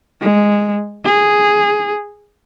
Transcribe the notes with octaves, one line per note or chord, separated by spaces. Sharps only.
G#3
G#4